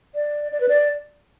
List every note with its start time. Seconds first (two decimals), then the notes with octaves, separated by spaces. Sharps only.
0.15 D5
0.52 D5
0.61 B4
0.69 D5